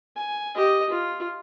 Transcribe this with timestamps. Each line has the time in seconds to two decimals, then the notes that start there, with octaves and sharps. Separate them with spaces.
0.16 G#5
0.55 G4 D#5
0.89 F4